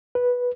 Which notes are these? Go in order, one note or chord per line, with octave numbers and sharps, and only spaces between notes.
B4